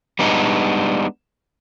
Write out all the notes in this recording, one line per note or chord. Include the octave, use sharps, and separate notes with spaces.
G3 G#3 B3 D4 D#4